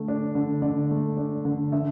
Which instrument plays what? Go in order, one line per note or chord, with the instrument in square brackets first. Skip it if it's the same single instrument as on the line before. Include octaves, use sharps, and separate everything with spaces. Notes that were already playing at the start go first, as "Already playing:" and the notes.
Already playing: [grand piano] D3 A3
D4
D3
D3 D5
A3
D4
D3
D3 E5